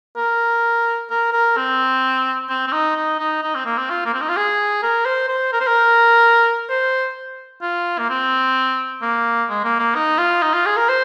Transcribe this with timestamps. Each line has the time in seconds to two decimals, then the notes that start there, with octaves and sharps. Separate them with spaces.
0.17 A#4
1.10 A#4
1.33 A#4
1.57 C4
2.49 C4
2.67 C4
2.73 D#4
2.96 D#4
3.19 D#4
3.43 D#4
3.55 C4
3.66 A#3
3.77 C4
3.90 F4
4.05 A#3
4.14 C4
4.21 D#4
4.29 F4
4.37 G#4
4.83 A#4
5.05 C5
5.29 C5
5.53 A#4
5.60 C5
5.67 A#4
6.69 C5
7.62 F4
7.99 A#3
8.10 C4
9.02 A#3
9.49 G#3
9.64 A#3
9.79 A#3
9.95 D#4
10.18 F4
10.42 D#4
10.53 F4
10.66 G#4
10.77 A#4
10.89 C5